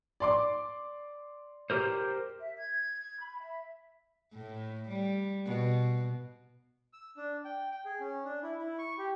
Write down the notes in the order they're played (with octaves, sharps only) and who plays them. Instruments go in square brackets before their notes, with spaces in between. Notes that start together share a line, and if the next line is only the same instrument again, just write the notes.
[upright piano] D5 C6 D6
[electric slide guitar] G4 A#4 C5
[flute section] E5
G#6
B5
E5
[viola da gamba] A2
G3
B2
[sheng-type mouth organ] E6
D4
G5
G5
G#4
C#4
D4
E4
E4
C#6
G4